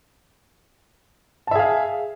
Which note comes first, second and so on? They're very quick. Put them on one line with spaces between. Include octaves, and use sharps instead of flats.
A5 E5 G#4 F5